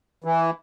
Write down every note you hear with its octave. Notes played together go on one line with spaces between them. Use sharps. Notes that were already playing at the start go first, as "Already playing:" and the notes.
E3